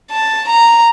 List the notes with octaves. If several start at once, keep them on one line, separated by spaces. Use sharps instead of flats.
A5
A#5